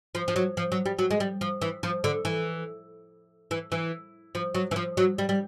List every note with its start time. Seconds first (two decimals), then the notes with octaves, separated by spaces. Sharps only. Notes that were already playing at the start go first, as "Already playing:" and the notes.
0.15 F3
0.28 F3
0.36 F#3
0.57 F3
0.72 F#3
0.86 G3
0.99 F#3
1.11 G#3
1.20 G3
1.41 F3
1.62 E3
1.83 F3
2.04 D3
2.25 E3
3.51 E3
3.72 E3
4.35 F3
4.54 F#3
4.71 E3
4.76 F3
4.97 F#3
5.18 G3
5.29 G3